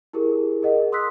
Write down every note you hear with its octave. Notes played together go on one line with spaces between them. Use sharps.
E4 G4 G#4 A#4
G#4 A#4 D#5 F#5
C6 D#6 E6 F#6 B6